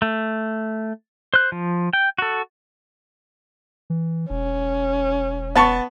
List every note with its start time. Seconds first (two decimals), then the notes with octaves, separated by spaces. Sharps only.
0.02 A3
1.34 C5 F#6
1.52 F3
1.93 G5
2.18 F#4 A4
3.90 E3
4.30 E1 C#4
5.56 B3 A5 C#6